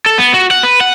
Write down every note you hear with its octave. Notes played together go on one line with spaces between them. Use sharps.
A4
B3
F#4
F#5
B4
F#5